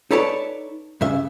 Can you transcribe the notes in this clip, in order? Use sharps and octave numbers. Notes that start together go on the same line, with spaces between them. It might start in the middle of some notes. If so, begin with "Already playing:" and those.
D#4 A4 B4 C#5 D5 A5
G2 C#3 E5